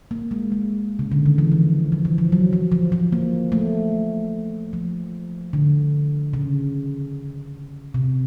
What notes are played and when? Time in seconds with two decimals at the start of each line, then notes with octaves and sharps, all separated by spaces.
0.11 A#3
0.31 G#3
0.52 G#3
0.99 C#3
1.12 D3
1.26 D#3
1.38 E3
1.52 F3
1.92 F3
2.05 E3
2.18 F3
2.32 F#3
2.53 F3
2.72 F3
2.92 F3
3.12 A#3
3.52 A3
4.73 F3
5.53 D3
6.33 C#3
7.94 C3